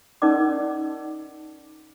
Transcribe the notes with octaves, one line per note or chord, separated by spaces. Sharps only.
C#4 D#4 A#4 D5 D#5 D6